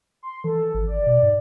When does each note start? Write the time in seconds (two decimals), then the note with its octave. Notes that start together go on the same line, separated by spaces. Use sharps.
0.23 C6
0.44 E3 A4
0.74 G#1
0.87 D5
1.06 B2
1.22 G#2